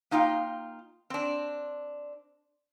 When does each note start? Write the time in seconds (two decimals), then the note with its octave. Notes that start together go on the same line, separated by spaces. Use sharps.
0.11 A#3 D#4 F4 F5 G5
1.10 C4 D4